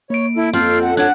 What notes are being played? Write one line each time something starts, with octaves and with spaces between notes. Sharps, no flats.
A#3 C#5 D7
E4 A4
F2 C4 F4 A4
F#5
D4 C#5 F#5 F#6